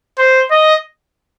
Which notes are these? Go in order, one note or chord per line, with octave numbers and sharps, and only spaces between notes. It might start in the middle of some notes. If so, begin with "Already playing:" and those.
C5
D#5